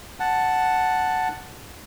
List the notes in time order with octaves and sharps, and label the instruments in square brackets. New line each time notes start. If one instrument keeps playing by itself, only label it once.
[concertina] F#5 A5